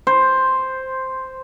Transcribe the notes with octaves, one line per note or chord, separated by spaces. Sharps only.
C5